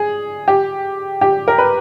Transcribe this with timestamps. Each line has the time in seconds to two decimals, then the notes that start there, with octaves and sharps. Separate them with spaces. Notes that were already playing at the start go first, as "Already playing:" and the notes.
Already playing: G#4
0.48 G4
1.21 G4
1.48 A#4
1.58 B4